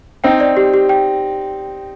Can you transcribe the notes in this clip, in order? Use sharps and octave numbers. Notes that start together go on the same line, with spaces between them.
C4 D#4 G5
D5
G4
G4
G5